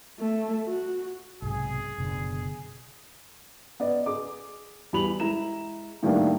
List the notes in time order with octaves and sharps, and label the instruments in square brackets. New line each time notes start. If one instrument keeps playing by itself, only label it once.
[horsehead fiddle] A3
F#4
[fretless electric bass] B1 G#2 C3 [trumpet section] G#4
[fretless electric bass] F#1 B2 D3
[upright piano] B3 D5 D#5
G#4 D6
E2 G3 G4 B5 F7 F#7
G#3 E4 A#5 E7
A2 D#3 G3 A3 A#3 D4